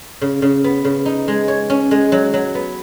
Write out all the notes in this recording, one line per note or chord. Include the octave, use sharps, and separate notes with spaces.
C#3
C#3
B3
C#3
D#4
G#3
C#5
C#4
G#3
F#3
F#3
B3